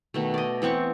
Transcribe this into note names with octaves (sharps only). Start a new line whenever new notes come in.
B2 D#3 A3
D5 D#5
E3 B3 C4 C#6